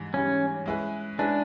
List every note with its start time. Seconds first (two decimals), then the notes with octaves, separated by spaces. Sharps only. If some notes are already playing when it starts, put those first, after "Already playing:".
Already playing: G#2 E3 G3
0.13 G#2 E3 G3 C#4
0.66 G#3 C#4 E4 G#4 B4
1.18 G#3 C#4 D4 E4 G#4 B4